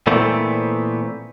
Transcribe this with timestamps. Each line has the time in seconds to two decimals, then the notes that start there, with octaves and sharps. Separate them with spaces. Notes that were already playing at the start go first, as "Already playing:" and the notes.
0.07 A#2 E3 A3 B3 C4